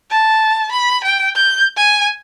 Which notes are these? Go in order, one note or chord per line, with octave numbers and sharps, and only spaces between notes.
A5
B5
G5
G6
G#5